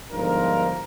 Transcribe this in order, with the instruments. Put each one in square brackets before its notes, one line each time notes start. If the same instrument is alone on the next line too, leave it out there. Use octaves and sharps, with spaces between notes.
[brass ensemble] G1 G#2 F3 D4 F4 A#4